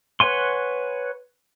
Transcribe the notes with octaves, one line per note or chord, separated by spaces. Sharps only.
B4 C#5 F#5 G#5 C6